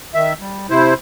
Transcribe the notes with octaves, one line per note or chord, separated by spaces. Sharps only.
D#3 E5
G3
C3 E4 C5